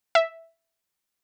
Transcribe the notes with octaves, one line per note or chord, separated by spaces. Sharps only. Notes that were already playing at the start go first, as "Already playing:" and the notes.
E5